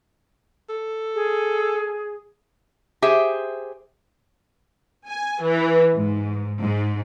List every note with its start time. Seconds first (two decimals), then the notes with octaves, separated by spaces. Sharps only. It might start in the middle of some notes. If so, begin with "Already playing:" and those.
0.69 A4
1.15 G#4
3.02 G4 G#4 C5 E5
5.08 G#5
5.43 E3
5.95 G#2
6.62 G#2